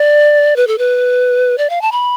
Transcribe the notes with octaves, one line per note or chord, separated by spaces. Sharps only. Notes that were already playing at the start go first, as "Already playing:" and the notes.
Already playing: D5
B4
A4
B4
D5
F5
A5
B5